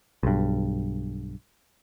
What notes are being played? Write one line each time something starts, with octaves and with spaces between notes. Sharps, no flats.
B1 G2